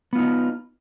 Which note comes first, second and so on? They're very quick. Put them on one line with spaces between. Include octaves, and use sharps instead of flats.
B3 F4 D#4